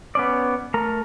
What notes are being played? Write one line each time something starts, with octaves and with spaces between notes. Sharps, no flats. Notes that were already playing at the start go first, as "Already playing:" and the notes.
B3 C#4 D5
A3 A#4 A#5